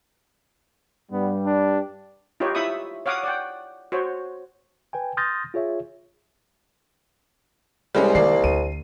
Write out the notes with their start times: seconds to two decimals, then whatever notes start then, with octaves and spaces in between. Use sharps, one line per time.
1.12 G2 G3 B3
1.46 D4
2.40 D#4 F4 G4 B4 C#5
2.55 E4 E5 B5 C#6 D#6
3.06 C#5 F5 F#5 D6 D#6
3.24 D5 F#5 G5
3.92 F#4 C5 C#5
4.93 B4 G5 G#5
5.17 C6 D#6 F6 G6 A6 A#6
5.54 F4 G#4 C#5 E5
7.95 C2 G3 G#3 C#4
8.15 D#3 A#3 D5 C7
8.44 D2 D#7